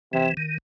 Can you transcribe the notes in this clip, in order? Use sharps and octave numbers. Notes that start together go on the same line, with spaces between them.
C3 E3
D#3